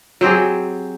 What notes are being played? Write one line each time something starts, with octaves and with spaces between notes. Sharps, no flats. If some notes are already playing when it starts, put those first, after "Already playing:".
F#3 C4 G4 G#4